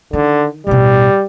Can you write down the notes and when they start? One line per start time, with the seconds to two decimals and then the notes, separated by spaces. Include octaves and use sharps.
0.13 D3 D#3
0.67 A1 B2 G3